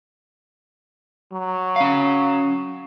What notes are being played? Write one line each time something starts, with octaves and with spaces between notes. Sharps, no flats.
F#3
C#4 F5